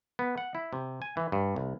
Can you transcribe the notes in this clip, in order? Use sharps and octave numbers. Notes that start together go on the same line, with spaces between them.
B3
F#5
E4
C3
G#5
E3
G2
C2